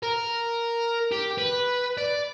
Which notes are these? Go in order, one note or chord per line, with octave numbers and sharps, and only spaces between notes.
A#4
G4
B4
D5